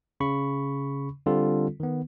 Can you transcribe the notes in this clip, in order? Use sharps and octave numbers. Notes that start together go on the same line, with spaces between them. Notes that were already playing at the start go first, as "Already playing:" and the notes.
C#3 B5 C#6
D3 G3 C4 F4 A4
D#3 B3